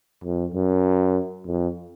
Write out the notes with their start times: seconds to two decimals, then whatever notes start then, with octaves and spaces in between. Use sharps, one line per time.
0.24 F2
0.54 F#2
1.47 F2